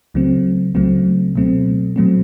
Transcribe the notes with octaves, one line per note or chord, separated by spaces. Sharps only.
C#2 C#3 F#3 A3 C4
C#2 C#3 F#3 A3 C4
B2 F#3 A3 C4
B2 F#3 A3 C4